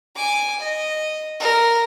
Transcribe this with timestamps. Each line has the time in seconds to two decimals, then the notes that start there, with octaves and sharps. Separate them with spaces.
0.16 G#5 D6
0.60 D#5
1.40 A#4